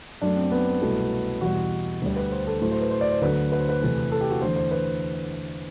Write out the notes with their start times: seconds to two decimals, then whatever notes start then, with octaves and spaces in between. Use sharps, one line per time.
0.22 F#2 F#3 A3 D4
0.36 C4
0.52 B3
0.82 C2 B2 F#3 A3
1.41 E2 B2 G3 F#4
2.02 D2 D3 G3
2.16 B4
2.32 C5
2.47 A4
2.61 A2 F#3 A3 C5
2.72 C5
2.81 B4
2.91 C5
3.01 D5
3.12 C5
3.21 D2 D3 F#3 A3 B4
3.52 B4
3.60 C5
3.69 B4
3.81 E2 C3 E3 A3
4.12 A4
4.21 G4
4.31 F#4
4.42 E2 D3 A3 C5
4.56 C5
4.71 B4